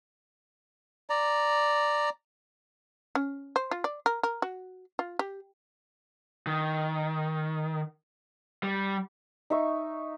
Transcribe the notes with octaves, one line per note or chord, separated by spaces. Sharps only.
D5 A#5
C#4
C5
F4
D5
A#4
A#4
F#4
F4
G4
D#3
G3
D#4 E5 C#6